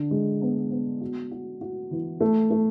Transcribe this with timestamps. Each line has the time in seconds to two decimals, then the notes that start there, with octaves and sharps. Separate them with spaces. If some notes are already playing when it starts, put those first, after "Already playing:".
Already playing: D3
0.11 G#3
0.42 B3
0.71 B3
1.01 F#4
1.31 F#4
1.61 F#4
1.91 E3
2.21 A3
2.51 A3